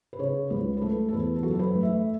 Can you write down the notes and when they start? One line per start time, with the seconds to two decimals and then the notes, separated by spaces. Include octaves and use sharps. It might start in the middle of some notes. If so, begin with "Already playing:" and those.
0.13 B4
0.19 C#3 C#5
0.50 C#2 B4
0.77 B4
0.81 A3 A4
1.08 A4
1.13 E2 B4
1.36 A4
1.43 F#1 F#4
1.50 A4
1.59 B4
1.75 A3
1.83 E5